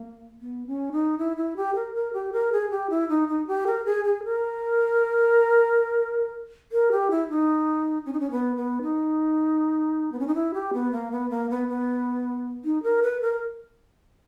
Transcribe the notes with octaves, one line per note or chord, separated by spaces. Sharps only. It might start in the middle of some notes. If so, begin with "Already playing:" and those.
Already playing: A#3
B3
C#4
D#4
E4
E4
G4
A#4
A#4
G4
A#4
G#4
G4
E4
D#4
D#4
G4
A#4
G#4
G#4
A#4
A#4
G4
E4
D#4
C#4
D#4
C#4
B3
B3
D#4
B3
C#4
D#4
E4
G4
B3
A#3
B3
A#3
B3
B3
D#4
A#4
B4
A#4